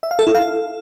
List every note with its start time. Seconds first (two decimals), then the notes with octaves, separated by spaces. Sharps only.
0.03 E5
0.11 F5
0.19 A4
0.27 E4
0.35 F5